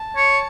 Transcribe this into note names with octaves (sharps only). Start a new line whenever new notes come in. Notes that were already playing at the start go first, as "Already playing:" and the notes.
Already playing: A5
C#5